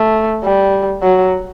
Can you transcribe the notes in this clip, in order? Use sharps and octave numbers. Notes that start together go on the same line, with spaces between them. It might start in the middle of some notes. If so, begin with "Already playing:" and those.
Already playing: A3
G3
F#3